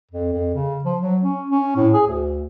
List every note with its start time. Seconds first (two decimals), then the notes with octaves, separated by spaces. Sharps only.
0.11 F2
0.32 F2
0.54 C#3
0.84 F3
1.01 F#3
1.23 C#4
1.50 C#4
1.76 A2
1.94 G#4
2.07 D2